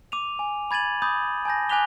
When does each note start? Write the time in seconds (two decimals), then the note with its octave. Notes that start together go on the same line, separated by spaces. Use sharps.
0.12 D6 D#7 F7
0.39 G#5
0.71 B5 G#6 A6 D#7 F#7
1.02 B5 D6 D#6 G6 A6
1.45 G#5 A5 G6 A#6
1.69 G#5 D6 F#6 B6 F7 G7